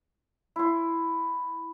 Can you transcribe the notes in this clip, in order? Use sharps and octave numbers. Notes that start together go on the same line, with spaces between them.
E4 C6